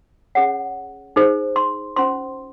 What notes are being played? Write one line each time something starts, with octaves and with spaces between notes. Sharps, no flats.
C#4 G#4 C#5 F#5
D#4 G#4 C5
C6
C#4 F4 C5 C6